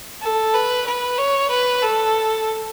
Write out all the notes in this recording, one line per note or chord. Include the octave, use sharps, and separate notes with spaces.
A4
B4
B4
C#5
B4
A4